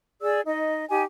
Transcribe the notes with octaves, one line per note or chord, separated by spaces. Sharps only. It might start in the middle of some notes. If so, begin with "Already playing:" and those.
G#4 D5 E6
D#4 D#5
D#4 G4 G#5